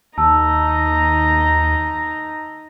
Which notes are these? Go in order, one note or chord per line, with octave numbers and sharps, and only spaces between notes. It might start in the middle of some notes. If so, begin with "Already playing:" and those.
D#2 D#4 A5 A#5 E6